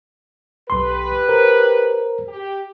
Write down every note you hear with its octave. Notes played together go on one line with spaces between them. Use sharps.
B1 G4 B4 C6
A#4 C5
G4